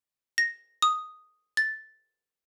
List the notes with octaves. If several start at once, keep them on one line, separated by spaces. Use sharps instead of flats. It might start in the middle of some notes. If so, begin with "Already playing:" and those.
A#6
D#6
A6